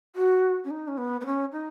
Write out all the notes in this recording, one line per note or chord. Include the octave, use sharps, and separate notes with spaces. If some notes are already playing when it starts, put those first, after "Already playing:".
F#4
C#4
D#4
C#4
B3
B3
C#4
D#4